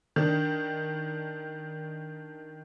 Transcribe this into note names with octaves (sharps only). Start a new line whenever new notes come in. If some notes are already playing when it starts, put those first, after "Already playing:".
D#3 D4